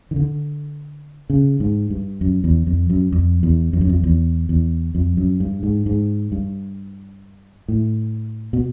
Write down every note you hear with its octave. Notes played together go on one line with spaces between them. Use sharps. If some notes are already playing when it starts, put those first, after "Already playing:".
D#3
D3
C#3
G#2
G2
F#2
E2
F2
F#2
F2
E2
F2
F#2
F2
E2
E2
F2
F#2
G2
G#2
G#2
G2
A2
B2